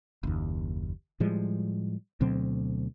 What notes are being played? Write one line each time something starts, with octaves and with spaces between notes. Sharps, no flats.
F#1 D#2
A2 F3 G3 G#3
D2 B2 F#3 C4